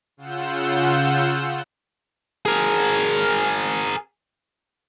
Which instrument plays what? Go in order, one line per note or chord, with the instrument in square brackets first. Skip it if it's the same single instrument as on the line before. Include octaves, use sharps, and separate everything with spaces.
[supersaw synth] C#3 F4 F#5 E6 G6 E7
[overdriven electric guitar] G#4 A#4